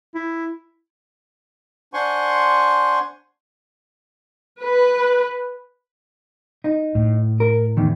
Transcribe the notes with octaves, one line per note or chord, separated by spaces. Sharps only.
E4
D4 C5 F#5 G#5 C6 C#6
B4
D#4
A2
A#4
E2 D#3